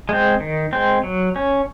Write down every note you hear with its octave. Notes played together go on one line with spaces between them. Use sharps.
G#3 C4
D#3
G#3 C4
F#3
C#4